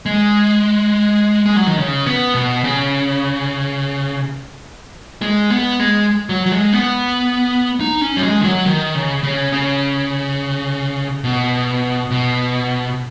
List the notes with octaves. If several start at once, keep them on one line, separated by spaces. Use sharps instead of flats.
G#3
G#3
F#3
D#3
C#3
B3
B2
C#3
G#3
B3
G#3
F#3
F#3
G#3
B3
D#4
C#4
F#3
G#3
D#3
F#3
D#3
C#3
C#3
C#3
B2
B2